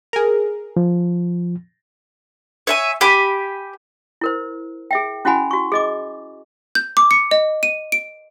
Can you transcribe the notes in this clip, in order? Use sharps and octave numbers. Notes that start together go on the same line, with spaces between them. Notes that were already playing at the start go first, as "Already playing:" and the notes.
G#4 A#4
F3
C#5 E5 G#5
G4 G#5 B5
E4 A#4 C5
G#4 E5 G5
C#4 E4 F#4 F#5 G#5 B5
F#4 C#6
G#4 D#5 D6
G6
D6
C#7
D#5
D#7
D7